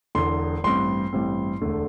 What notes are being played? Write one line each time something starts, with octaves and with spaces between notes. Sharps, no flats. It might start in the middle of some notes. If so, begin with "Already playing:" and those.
E1 E2 D3 C6
A1 G2 G3 C4 C6
A1 G2 G3 C4
E1 D2 D3 A3